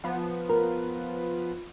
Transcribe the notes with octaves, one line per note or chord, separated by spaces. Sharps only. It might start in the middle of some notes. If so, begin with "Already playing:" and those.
F3 B3
A#4